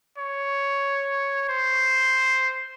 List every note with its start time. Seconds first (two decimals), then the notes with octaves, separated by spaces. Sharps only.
0.18 C#5
1.49 C5